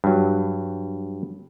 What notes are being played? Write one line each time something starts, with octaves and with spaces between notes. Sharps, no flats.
G2 F#3